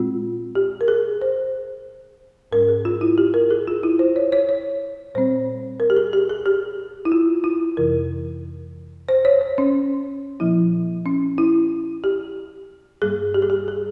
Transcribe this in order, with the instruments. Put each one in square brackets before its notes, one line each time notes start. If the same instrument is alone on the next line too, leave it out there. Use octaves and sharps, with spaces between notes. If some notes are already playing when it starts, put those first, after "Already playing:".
Already playing: [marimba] A#2 G#3 C4 F4
G4
A#4
G#4
C5
G#2 G3 C#4 A#4
G#4
F4
E4
G4
A#4
G#4
F4
E4
C5
C#5
C#5
C#5
A#2 G3 C4 C5
A#4
G4
G#4
G4
G#4
G4
E4
F4
E4
F2 C3 E3 A#4
C5
C#5
C5
C#4
A#2 F3 A#3 E4
C#4
E4
G4
G2 G3 A#3 G#4
G4
G#4
G4
G#4